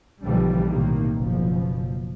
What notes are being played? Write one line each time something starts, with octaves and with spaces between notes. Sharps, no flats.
B1 D3 E3 F3 G3
B1 A2 C3 D#3 A#3
F#1 B2 F3